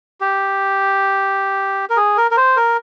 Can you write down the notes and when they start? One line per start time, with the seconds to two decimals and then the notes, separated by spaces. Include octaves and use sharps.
0.21 G4
1.90 A#4
1.97 G#4
2.17 A#4
2.31 A#4
2.37 C5
2.57 A#4